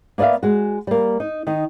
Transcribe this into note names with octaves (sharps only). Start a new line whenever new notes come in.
A#3 B3 D5 E5 F5
G#3 F#4
G3 A#3
D#4
D#3 D#4